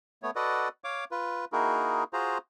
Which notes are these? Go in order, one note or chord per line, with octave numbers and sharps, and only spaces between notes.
A3 B3 C#5
F#4 A4 B4 D5 D#5 F#5
C#5 F5 D6
F4 B4
A#3 D#4 E4 F#4 G#4 A#4
F4 F#4 G#4 C5 A#5